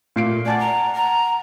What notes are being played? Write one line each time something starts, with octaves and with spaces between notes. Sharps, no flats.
A#2 A3 C7 D7
D5 F#5 G#5 A5 A6
A#5
A#5